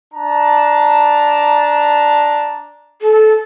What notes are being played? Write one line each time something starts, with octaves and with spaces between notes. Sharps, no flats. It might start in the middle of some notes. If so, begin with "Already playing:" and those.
D4 A5 A#5
A4